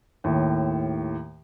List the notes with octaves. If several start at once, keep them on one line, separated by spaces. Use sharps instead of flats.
D#2 A2